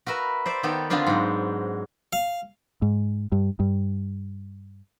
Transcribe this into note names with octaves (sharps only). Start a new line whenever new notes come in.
F#4 A#4 B4 E5
C5 D5 E5
D#3 B3 G4 A4
D3 B3 C4 D4 F4 G4
G#2 F#3
F5
G#2
G2
G2